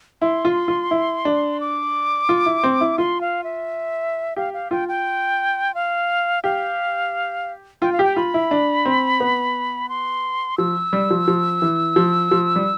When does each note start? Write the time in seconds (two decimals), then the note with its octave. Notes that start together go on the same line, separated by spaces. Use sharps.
0.21 E4 C6
0.45 F4
0.68 F4
0.91 E4
1.25 D4
1.60 D6
2.29 F4
2.46 E4
2.63 C4
2.81 E4
2.98 F4 C6
3.21 F5
3.44 E5
4.36 G4 F5
4.54 F5
4.71 F4 G5
4.88 G5
5.75 F5
6.44 G4 F5
7.82 F4 G5
7.93 F5
7.99 G4 G5
8.16 F4 B5
8.34 E4
8.51 D4
8.85 C4
9.20 B3
9.89 C6
10.58 F3 E6
10.93 G3
11.10 F3
11.28 F3
11.62 E3
11.96 F3
12.31 F3
12.56 G3